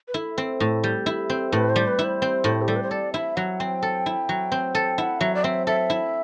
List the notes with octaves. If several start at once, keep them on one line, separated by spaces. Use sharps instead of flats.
B4
E4 A4
C4
A2
G3
E4
C4
A2 B4
C5
G3
B4
E4
C5
C4
A2
G4
G3 A4
B4
C5
A4 D5
E4 E5
F#3 F#5
C4 G5
A4
E4
F#3
C4
A4
E4 F#5
F#3 E5
D5
C4 E5
A4 E5
E4